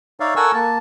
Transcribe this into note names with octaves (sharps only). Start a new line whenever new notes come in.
D#4 C#5 D5 E5 F5
A4 A#4 F#5 G#5 C#6 E6
A#3 A5